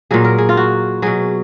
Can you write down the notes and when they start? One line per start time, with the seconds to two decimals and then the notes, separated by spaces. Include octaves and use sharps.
0.11 A#2 F#3 G#4
0.24 A#4
0.38 G#4
0.49 F4
0.57 F#4
1.02 B2 F#3 G#4